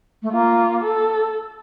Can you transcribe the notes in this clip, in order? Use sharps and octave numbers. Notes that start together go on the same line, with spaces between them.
A3
A#3 F4
A4